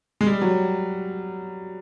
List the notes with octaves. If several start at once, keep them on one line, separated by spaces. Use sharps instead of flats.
G#3
G3
F#3